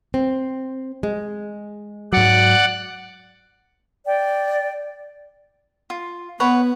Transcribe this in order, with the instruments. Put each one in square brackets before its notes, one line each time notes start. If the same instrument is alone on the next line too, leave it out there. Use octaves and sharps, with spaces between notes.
[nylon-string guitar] C4
G#3
[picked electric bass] G#2 F#3 [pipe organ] D5 F#5
[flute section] D5 G5
[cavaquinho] F4
[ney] B3 [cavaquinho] B4 C#5 F#5